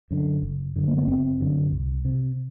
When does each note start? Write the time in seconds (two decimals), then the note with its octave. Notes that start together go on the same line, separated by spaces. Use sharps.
0.11 F#2 D3
0.43 F#1
0.76 F#2 D3
0.88 A#3
0.98 B3
1.07 F#1 C4
1.40 F#2 D3
1.72 C2
2.05 C3